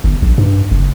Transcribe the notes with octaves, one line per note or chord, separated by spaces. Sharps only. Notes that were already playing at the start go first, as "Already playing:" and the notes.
G1
A#1
G2
F#1